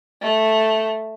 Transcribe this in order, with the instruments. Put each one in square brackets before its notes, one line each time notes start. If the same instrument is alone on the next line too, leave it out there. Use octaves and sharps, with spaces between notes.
[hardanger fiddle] A3